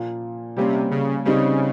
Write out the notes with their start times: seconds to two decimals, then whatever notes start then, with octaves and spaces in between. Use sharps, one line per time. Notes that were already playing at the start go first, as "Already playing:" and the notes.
Already playing: A#2 F3 A#3
0.57 C3 G3 A#3 C#4
0.91 C#3
1.25 C#3 G3 C4 D#4